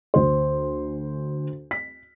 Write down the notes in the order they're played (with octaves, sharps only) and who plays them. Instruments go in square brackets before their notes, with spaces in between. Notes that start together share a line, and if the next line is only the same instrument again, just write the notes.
[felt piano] D2 C5
B6